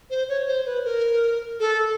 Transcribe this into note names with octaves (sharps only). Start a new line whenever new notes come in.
C5
C#5
C5
B4
A#4
A4